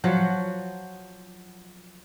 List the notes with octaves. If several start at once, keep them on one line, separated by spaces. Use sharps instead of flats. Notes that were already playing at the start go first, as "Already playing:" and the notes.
F3 F#3 F#4